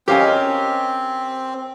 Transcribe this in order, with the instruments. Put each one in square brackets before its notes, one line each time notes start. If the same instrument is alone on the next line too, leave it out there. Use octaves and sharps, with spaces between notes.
[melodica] C4 [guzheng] C#4 A#4 D#5 [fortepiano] G4 F5 G#5